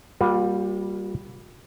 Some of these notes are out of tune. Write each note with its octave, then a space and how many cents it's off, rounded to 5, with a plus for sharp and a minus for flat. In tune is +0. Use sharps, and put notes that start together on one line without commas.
G3 +0 A#3 +0 F4 +40